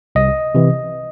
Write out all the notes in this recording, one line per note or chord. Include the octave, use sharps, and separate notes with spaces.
C2 D#5
C3 E3